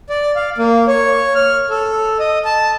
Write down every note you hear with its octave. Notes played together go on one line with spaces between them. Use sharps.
D5
F5
A#3
C#5
F6
A4
D#5
A5